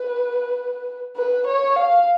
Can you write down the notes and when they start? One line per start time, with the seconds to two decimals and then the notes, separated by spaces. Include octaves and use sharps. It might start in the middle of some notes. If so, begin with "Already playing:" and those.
Already playing: B4
1.16 B4
1.47 C#5
1.76 F5